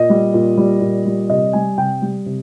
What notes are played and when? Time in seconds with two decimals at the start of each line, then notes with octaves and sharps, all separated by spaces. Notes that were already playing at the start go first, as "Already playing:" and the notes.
Already playing: A#2 D#5
0.10 G3
0.34 A#2
0.58 G3
0.81 A#2
1.06 G3
1.30 C3 D#5
1.53 G3 G#5
1.78 C3 G5
2.02 G3
2.26 C3